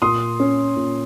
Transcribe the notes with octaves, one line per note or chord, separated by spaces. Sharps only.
A#2 C6 D#6
C#4
A#2